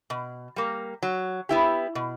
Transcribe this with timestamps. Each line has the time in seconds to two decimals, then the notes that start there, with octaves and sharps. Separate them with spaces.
0.10 B2
0.56 G3 A#3
1.03 F#3
1.49 B3 E4 G4
1.95 B2